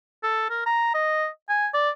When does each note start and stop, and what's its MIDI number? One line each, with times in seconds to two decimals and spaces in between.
0.23 0.47 69
0.50 0.65 70
0.66 0.90 82
0.94 1.27 75
1.49 1.67 80
1.74 1.90 74